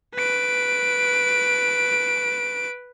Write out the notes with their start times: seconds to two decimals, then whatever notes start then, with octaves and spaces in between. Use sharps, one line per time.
0.14 B4 D7